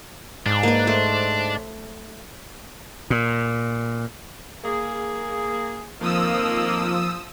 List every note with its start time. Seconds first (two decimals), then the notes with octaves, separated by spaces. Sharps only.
0.46 G#2 D4
0.63 A#3 B4
0.87 A3 C5
3.10 A#2
4.64 A#3 G#4
6.00 F2 D#3 F3 A#3 D#6 E6